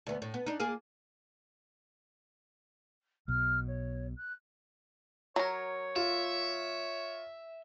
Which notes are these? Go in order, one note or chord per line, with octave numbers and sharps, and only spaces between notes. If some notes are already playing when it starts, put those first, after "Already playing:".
D2 B3
A2
B3
D4 D#4
A#3 F4 G#4
B1 B2 F6
C#5
F#6
F#3 A#4 C#5
F4 E5